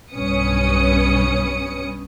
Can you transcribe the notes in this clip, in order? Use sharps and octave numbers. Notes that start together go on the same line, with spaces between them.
B1 G2 C#4 B4 D#6 C#7